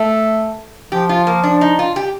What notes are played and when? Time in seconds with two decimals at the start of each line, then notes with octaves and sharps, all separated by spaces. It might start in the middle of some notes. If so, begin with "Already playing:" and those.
Already playing: A3 A4
0.92 F3 G4
1.09 F4
1.27 A#3
1.43 D4
1.61 D#4
1.79 F4
1.96 G4